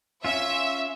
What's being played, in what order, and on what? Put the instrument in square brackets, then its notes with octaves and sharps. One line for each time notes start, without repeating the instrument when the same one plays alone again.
[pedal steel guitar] C#4 F4 [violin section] E5